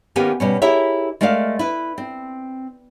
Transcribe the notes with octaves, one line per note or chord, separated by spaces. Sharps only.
D#3 A#3 B3 C#4 G4 G#5
B2 G3 C#4
E4 G4 G#4 A#4 C#5 E5
G#3 A3 A#4 D5 F5
E4 B4
C4